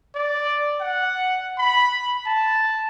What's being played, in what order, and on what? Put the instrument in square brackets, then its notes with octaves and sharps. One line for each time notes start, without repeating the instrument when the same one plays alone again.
[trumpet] D5
F#5
B5
A5